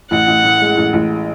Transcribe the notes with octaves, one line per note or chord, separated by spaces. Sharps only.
A1 F#5
A1
A2
G#3
A1
A1